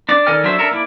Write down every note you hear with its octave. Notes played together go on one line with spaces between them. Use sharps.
D4 D5
D#3 A4 D5 G#5 F6
F#3 D4 A4 C5 E5
D4 A4 A#4 E5
A#3 E4 D5